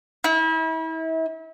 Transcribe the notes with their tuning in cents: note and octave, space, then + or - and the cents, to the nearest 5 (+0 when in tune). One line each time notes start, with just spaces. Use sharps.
E4 -35